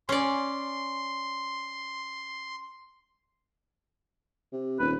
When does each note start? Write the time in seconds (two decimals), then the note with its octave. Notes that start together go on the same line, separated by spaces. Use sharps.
0.09 C#4 D5 C6
4.52 C3
4.80 D#1 B4